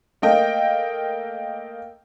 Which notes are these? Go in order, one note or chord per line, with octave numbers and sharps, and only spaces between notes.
A3 A#3 D#5 G5